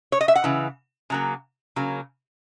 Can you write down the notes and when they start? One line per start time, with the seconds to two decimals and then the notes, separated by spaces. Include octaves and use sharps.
0.12 C#5
0.21 D#5
0.28 E5
0.35 F#5
0.44 C#3 E3
1.10 C#3 F#3 A#3
1.76 C#3 F#3 A#3